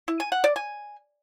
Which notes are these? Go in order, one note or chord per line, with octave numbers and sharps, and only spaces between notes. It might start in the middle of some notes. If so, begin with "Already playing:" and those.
E4
G#5
F#5
D5
G#5